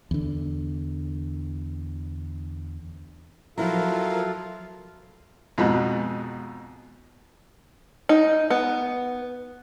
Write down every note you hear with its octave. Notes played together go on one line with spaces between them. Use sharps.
E2 D3
F3 F#3 E4 F4 A4 A#4 F5
F2 G#2 B2
D#4
B3